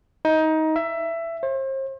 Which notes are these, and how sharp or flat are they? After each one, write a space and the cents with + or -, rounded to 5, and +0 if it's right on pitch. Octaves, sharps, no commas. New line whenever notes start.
D#4 +20
E5 +15
C5 +40